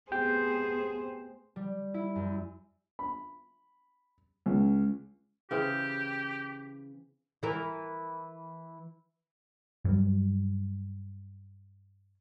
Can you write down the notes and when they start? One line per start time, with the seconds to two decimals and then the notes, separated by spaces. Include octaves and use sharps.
0.12 A3 B3 C4 G4 G#4 C5 G5 G6
1.56 G3
1.94 E4
2.16 F#2
2.99 B5
4.46 C#2
5.51 C#3 E3 C4 G4
7.43 E3 A#4
9.85 G2 F#3